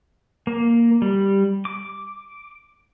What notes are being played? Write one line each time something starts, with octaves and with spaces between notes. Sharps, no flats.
A#3
G3
D6